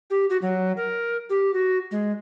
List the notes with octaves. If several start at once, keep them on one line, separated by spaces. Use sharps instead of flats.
G4
F#4
F#3
A#4
G4
F#4
G#3